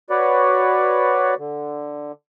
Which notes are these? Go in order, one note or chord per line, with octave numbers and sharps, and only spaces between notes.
F#4 B4 C#5 D5
D3